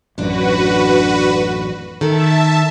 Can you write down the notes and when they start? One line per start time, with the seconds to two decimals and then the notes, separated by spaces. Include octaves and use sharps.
0.18 A1 F#2 D3 D4 F#4 B4
2.01 D#3 A4 E5 A5